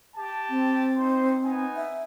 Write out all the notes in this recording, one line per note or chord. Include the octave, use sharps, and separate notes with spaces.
G4 A5
C4
D#4 C5
B3 D#4 G#5
E5